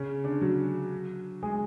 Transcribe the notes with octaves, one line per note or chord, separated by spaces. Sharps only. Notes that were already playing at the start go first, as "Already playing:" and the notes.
Already playing: C#3 C#4
D3 D4
F#3 F#4
G#3 G#4